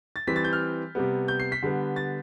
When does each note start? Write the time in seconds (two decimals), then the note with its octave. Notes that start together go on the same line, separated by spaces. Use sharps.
0.16 A6
0.27 E3 G3 C4 B6
0.36 A6
0.44 G6
0.53 F6
0.95 C3 G3 B3
1.28 G6
1.40 C7
1.52 B6
1.62 D3 G3 B3
1.96 A6